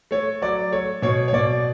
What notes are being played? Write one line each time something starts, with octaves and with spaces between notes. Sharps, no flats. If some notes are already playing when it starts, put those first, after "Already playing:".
A3 C#5
F#3 D5
A3 C#5
B2 C#5
C#5
B2 D5